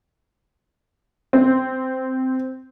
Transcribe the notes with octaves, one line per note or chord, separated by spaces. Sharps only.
C4